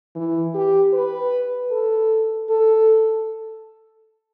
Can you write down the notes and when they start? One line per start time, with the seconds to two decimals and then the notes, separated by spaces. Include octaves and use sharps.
0.16 E3
0.54 G4
0.93 B4
1.71 A4
2.49 A4